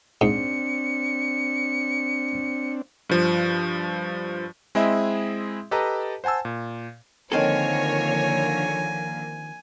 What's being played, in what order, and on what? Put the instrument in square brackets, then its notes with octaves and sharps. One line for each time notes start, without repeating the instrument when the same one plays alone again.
[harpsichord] G#2 [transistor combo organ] C4 D4 [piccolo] C#7
[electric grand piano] G2 F3
G#3 C4 E4 G#4 D#5 E5
G4 A4 B4 D#5 A5 A#5
C5 F#5 G#5 A5 E6
A#2
[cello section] D3 F3 A#3 [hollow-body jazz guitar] D#3 C4 A4 [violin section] C#5 [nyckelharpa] G#5